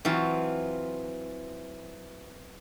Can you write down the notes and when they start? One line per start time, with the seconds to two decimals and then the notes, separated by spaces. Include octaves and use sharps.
0.05 E3 F#3 C4 F4